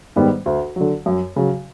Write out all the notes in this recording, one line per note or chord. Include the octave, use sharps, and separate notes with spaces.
G#2 D#3 G3 B3
D2
D3 F#3
F#2
C#3 F#3